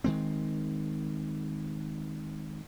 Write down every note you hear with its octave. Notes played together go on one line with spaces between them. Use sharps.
D#3 G#3 C4